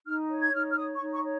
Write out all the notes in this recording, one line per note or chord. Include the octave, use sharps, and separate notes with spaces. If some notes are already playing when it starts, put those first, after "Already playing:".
D#4 F6
C#5
G#6
D#4 F6
F6
C#5 D#6
C#6
D#4
C#6
C#5